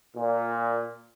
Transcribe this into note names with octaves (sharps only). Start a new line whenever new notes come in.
A#2